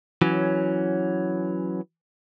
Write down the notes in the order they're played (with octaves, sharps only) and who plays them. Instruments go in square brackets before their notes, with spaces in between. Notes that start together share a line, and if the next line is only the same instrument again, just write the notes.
[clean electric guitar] E3 F#3 C#4